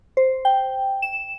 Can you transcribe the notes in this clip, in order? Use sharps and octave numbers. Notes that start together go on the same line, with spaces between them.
C5
G5
E7